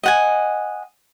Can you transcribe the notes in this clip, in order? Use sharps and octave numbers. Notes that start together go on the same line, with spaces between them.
D#5 F#5 G#5